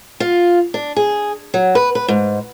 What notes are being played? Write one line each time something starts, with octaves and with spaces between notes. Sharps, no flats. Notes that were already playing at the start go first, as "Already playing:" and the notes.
F4
D4
G#4
F#3
B4
B4
G#2